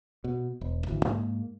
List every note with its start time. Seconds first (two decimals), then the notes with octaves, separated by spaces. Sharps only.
0.24 B2
0.61 E1
0.87 G#1 D2 E3
1.05 G#2 G#3 A#3